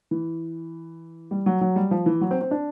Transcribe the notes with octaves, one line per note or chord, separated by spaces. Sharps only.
E3
G3
F#3
F#3
G3
F3
E3
F#3
C4
C4
D4